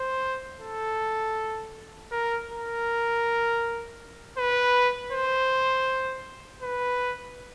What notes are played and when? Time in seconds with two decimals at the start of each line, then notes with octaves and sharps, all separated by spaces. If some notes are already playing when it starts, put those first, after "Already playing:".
Already playing: C5
0.60 A4
2.11 A#4
2.49 A#4
4.38 B4
5.12 C5
6.63 B4